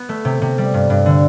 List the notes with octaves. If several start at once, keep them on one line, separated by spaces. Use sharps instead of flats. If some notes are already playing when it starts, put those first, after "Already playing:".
Already playing: B3
A3
C3
C3
G3
G2
G2
D3